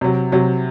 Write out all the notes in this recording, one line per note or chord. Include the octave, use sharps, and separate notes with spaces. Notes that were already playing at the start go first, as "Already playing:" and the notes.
C3 F#3
C3 F#3